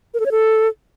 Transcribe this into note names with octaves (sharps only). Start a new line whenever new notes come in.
A#4
A4
C#5
A4